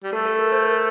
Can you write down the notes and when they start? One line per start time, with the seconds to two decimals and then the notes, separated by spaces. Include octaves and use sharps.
0.03 G3
0.13 A3 A4
0.26 A4
0.39 A#4
0.52 C5
0.65 A#4